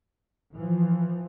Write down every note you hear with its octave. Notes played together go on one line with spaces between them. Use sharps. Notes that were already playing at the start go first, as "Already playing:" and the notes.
E3 F3